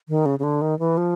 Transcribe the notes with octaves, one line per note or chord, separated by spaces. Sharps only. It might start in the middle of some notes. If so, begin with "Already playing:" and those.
D#3
C#3
C#3
D3
D#3
E3
F3